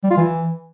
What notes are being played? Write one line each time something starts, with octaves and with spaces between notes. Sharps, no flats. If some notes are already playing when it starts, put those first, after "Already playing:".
G3
F4
E3